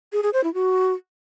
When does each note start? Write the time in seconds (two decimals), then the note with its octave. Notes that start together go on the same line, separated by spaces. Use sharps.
0.13 G#4
0.23 G#4
0.33 C5
0.44 E4
0.54 F#4